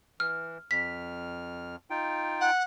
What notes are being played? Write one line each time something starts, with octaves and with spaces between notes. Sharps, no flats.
E3 F6
F2 F6 B6
D#4 F4 G5
F#5